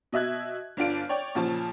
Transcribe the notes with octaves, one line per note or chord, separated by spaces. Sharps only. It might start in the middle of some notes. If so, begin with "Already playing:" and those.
B2 D#5 E5 F#6 G#6
G1 D4 F4 D7
C#5 D5 G5
A#2 C#3 F3 A5